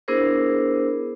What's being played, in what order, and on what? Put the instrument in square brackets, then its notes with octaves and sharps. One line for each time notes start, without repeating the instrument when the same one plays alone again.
[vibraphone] B3 D4 E4 G#4 A#4 C5